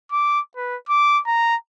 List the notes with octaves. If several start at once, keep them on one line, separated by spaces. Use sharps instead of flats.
D6
B4
D6
A#5